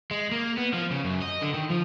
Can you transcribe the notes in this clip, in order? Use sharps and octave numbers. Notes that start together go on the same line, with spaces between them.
G#3
A#3
B3
F3
C#3
F#2
D#5
D3
D#3
F3